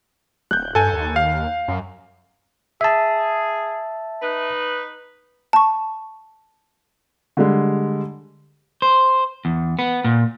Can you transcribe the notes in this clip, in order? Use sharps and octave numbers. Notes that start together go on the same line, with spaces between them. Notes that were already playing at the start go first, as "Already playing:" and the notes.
D1 F#6 G6
G2 A4 G#5
D#2
F5
F#2
G#4 E5 A5
D#4 B4
A5 C#6
D3 G3 G#3
C5
E2
B3
A#2